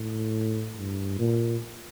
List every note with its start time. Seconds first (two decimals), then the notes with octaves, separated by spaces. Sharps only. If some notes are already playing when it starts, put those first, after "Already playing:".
Already playing: A2
0.77 G2
1.19 A#2